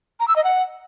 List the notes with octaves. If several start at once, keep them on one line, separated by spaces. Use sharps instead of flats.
A#5
E6
D#5
F#5